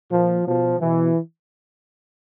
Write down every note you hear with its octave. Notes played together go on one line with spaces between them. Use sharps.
A#2 F3
B2 F3
B2 E3